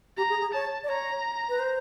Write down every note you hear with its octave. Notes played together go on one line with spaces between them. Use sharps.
G4 A#5
G#4
G#4
C#5 A5
D5
C#5 A#5
B4
C5